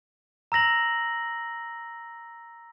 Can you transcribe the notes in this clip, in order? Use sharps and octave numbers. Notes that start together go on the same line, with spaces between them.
A#5 E6 A#6 F#7